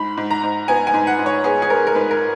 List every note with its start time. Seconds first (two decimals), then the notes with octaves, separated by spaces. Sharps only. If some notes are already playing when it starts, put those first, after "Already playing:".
Already playing: G#2 B5
0.17 G#2
0.31 A#5
0.43 G#2
0.68 B3 G#5
0.87 G#5
0.94 G#2
1.07 F#5
1.19 G#2
1.26 C#5
1.44 B3 G#4
1.62 G#4
1.70 B3 A#4
1.87 A#4
1.95 G#2 B4
2.11 A#4